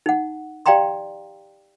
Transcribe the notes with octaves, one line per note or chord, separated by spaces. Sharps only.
D#4 F#5
G4 D5 F5 G5 A#5 C6